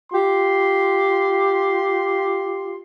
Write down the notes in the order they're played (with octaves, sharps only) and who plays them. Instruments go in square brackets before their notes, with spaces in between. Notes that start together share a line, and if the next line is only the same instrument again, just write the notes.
[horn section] F4 G4 C6